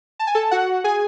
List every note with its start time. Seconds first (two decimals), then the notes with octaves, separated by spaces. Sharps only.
0.19 A5
0.27 G#5
0.35 A4 A5
0.51 F#4 F#5
0.84 G#4 G#5